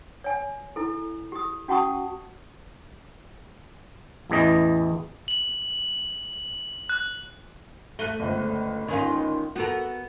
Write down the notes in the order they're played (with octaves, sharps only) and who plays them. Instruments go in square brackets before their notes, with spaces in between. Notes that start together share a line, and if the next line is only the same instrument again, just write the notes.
[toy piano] C#5 G#5
E4 A4
G4 D#6
C#4 F#4 F#5 A5 C#6 D#6
[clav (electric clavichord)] A1 E2 E3 D#5
[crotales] F#7
F#6
[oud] A3 [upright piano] F#6 D#7 G7
[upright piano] G1 C#2 C5
[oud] D#3 C#4 F4
[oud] B3 A#4 [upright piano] F#4 A4